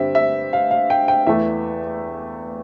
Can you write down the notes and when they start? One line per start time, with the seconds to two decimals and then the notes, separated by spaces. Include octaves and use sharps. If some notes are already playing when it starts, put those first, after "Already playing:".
Already playing: G2 D3 G3 C4 E5
0.15 E5
0.53 F5
0.71 F5
0.90 G5
1.08 G5
1.27 E2 E3 A3 E5